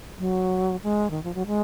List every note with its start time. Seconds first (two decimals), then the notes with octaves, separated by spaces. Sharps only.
0.19 F#3
0.83 G#3
1.11 D#3
1.24 F3
1.35 F#3
1.47 G#3